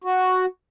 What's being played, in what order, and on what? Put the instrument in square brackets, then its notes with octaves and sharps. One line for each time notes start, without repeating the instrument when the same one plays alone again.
[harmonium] F#4